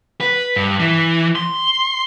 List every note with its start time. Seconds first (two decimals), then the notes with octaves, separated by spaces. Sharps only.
0.21 B4
0.56 G2
0.80 E3
1.35 C6